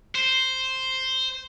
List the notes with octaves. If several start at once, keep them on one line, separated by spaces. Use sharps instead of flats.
C5